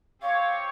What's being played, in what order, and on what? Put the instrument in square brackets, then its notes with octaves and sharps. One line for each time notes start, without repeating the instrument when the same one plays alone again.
[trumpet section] C4 G4 C#5 [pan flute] F5